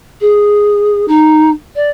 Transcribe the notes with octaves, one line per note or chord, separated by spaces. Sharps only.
G#4
D#4
D5